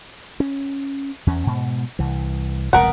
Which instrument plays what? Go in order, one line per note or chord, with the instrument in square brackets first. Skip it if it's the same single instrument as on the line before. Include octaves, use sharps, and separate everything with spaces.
[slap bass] C#4
E2 C#4
G#2 B2
C2 E3
[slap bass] E1 C2 A#2 [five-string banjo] B3 A#4 F#5